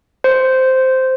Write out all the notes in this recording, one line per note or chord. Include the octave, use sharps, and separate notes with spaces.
C5